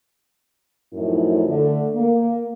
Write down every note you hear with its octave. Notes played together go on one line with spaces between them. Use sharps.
F#2 A2 F3 A3 D#4 E4
D3 A3
A#3